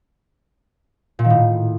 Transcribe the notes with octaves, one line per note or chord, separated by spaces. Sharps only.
A#2
D#3
A2